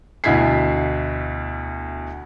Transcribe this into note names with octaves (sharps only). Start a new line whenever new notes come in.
D2 B2 E4 G#6 B6 C7